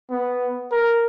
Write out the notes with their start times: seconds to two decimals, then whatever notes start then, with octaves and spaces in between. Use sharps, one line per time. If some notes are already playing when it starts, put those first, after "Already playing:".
0.11 B3
0.71 A#4